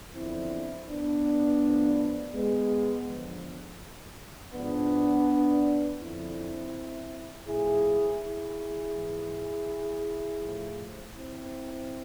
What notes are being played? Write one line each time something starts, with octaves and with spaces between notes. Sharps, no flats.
E2 D3 F3 C4 E4
B3 D4
A2 F3
G#3 B3
E2 D3 F3
G#2 F3 B3 D4
F2 D3 F3 C4 E4
A2 F3 E4 G#4
E4 G#4
G#2 E3
A2 F3
C4 E4